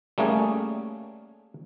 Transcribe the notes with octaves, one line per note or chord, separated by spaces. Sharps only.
G3 A3 A#3 C#4 G#4